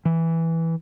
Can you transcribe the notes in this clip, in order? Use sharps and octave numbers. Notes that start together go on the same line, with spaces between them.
E3